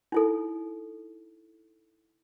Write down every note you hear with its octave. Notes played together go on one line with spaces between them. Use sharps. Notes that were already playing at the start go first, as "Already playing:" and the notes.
D#4 E4 A4